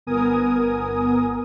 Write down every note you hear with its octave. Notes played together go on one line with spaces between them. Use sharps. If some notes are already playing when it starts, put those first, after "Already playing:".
G1 B3 A#4 G#5 D#6